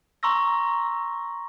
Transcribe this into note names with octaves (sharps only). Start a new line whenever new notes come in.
A#5 C6 C#6 E6 A#6